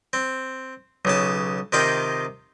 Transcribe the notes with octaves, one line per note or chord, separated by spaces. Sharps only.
C4
B1 C#3 A5
C3 D#3 F4 D#5 F5 G5